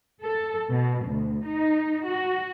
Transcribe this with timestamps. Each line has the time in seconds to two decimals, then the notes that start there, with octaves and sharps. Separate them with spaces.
0.22 A4
0.71 B2
1.06 D2
1.46 D#4
2.06 F#4